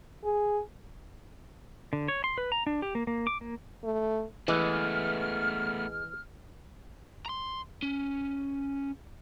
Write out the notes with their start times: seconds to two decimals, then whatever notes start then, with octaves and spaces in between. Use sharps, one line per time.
0.24 G#4
1.93 D3
2.08 C#5
2.24 C6
2.38 B4
2.52 A#5
2.67 D4
2.82 G4
2.95 A#3
3.07 A#3
3.27 D6
3.41 A#3
3.84 A3
4.48 E3 G#3 A3 B3 F6
7.26 A#5 C6
7.83 C#4